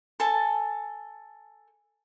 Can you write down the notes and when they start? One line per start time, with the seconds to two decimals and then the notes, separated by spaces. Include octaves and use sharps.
0.20 A4 G#5 A5